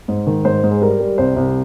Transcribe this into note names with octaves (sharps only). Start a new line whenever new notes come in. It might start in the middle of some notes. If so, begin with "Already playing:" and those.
G#2
D#3
G#2 C5
G#2
G#4
G3 A#4
G3
C2 C5
C2